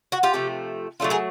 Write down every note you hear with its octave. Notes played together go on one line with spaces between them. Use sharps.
F#4
F4 G4
C3 F3 A3
F#3 A3 D4 F4
G#4 A#4